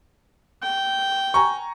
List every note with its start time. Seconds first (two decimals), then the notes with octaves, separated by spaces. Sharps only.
0.63 G5
1.34 G#5 A#5 C#6